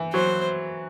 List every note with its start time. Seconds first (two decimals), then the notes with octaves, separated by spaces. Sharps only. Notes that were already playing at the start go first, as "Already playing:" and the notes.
Already playing: E3
0.13 F#3 C5